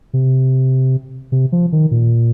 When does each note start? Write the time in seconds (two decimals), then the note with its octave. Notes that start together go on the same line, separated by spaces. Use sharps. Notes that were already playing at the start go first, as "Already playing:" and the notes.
0.13 C3
1.32 C3
1.52 F3
1.72 D#3
1.91 A#2